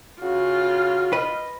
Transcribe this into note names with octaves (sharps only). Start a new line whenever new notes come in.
C#3 F4 F#4
B4 D#5